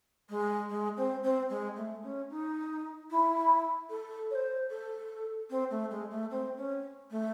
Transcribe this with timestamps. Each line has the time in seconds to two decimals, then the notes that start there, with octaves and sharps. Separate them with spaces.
0.29 G#3
0.70 G#3
0.97 C4
1.23 C4
1.50 G#3
1.76 A3
2.03 C#4
2.30 D#4
3.10 E4
3.90 A4
4.31 C#5
4.35 C5
4.70 A4
5.50 C4
5.70 A3
5.90 G#3
6.11 A3
6.30 C4
6.57 C#4
7.11 A3